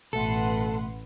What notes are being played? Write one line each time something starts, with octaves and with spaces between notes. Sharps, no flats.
A1 B2 A3 A4 B4 F#5 C6